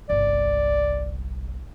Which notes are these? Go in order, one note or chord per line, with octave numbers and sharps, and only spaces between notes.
G1 C2 D5